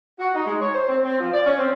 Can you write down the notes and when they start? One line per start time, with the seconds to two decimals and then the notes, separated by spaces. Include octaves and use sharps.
0.19 F#4
0.34 D#4
0.46 G#3
0.61 C#5
0.74 C5
0.88 C4
1.03 C4
1.20 F3
1.33 D5
1.46 C#4
1.59 C4